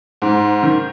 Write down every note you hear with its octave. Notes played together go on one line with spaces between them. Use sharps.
G#2
D#3